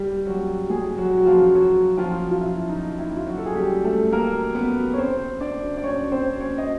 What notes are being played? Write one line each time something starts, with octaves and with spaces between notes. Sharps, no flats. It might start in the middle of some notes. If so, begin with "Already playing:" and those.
Already playing: G3 G4
F#3 F#4
G#3 G#4
F#3 F#4
F#4
F3 F4
F#3 F#4
F3 F4
F4
E4
D#4
E4
F4
F#3 F#4
A4
G#4
G3 G4
A3 A4
A#3 A#4
B3 B4
C#5
C4 C5
D4 D5
D5
C#4 C#5
C4 C5
C#4 C#5
D#5